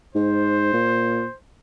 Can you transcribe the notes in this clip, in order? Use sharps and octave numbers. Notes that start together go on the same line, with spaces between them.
G#2 C5
A#2